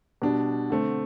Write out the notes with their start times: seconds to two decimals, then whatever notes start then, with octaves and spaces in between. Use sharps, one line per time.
0.22 B2 G3 D4
0.70 D3 A3 C4